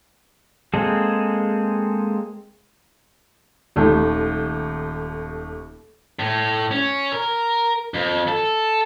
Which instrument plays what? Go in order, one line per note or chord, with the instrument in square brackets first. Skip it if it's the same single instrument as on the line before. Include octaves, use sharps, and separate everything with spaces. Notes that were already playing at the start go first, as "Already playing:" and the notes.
[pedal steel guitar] G#3 A#3 C4 G#4 A4
[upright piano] D#1 D#2 A3
[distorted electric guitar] A2
C#4
A#4
F2
A4